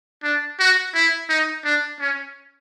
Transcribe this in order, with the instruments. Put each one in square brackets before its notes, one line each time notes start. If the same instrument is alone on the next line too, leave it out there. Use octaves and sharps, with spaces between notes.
[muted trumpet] D4
F#4
E4
D#4
D4
C#4